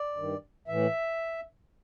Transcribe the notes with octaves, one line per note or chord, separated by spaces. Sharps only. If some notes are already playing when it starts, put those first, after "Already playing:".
Already playing: D5
G2 D#3
A2 E3 E5